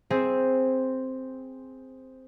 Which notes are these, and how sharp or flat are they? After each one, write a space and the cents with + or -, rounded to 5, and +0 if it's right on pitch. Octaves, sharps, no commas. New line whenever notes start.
C4 +0 G#4 +0 E5 -5